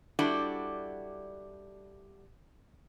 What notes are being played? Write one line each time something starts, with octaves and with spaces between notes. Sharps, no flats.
G3 D4 E4 F#4 A4 D5